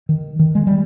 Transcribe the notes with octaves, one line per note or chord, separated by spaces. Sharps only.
D#3
D#3
G#3
G3